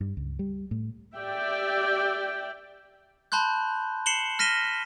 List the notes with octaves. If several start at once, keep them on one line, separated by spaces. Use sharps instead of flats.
G2
C#2
G3
A2
G4 D5 E5 G5
A5 B5 C6 F#6 G6
C7 C#7 E7 F#7 G7
F6 A#6 B6 D#7 E7 G7